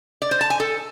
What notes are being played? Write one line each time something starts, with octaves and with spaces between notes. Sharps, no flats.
D5
C5
A5
G#5
A4